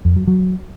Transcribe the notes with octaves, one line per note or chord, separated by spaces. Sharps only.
F2
F#3
F#3